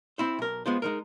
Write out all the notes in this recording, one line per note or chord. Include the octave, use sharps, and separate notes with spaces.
C4 E4 C5
B1 A#4
G#3 B3 F4 C5
G#3 D#4 A#4